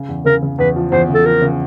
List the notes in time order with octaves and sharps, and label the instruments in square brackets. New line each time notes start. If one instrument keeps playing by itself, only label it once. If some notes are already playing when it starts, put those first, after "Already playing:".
Already playing: [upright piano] C#3
E2
[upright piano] C#3 [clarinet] A#4
[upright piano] C#3
[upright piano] E2 [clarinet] B4
[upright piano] F3
[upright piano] E2 [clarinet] C5
[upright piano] C#3
[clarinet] A4
[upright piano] F3 [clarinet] A#4
[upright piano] C#3